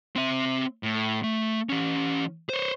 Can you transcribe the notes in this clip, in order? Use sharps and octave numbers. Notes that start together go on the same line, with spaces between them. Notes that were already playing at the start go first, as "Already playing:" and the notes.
C4 E5
A2
A3
E3 C#4
C5 C#5